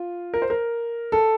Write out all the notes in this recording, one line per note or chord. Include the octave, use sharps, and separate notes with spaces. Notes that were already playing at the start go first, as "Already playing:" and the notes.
Already playing: F4
A#4
C5
A#4
A4